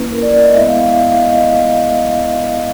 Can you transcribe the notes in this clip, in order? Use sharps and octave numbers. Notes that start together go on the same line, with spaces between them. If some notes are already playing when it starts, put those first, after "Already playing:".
Already playing: A#3 C#4 E4 B4
A#4
D5
D5
D#5
G#3 B3 E4 E5
F5
F5
F5
D#5